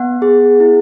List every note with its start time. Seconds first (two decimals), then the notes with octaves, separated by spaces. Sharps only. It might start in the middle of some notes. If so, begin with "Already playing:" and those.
Already playing: B3 F#5
0.22 G#4
0.60 E4